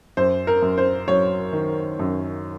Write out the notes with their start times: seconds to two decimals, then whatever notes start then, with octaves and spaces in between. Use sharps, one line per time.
0.17 F#2 C5
0.47 A#4
0.62 F#2
0.78 C5
1.08 F#3 C#5
1.53 D#3
1.99 F#2